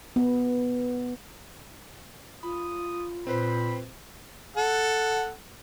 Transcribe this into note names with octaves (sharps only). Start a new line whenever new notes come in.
B3
F4 B5 D#6
A#2 C4 B4 C5 B5
A4 F#5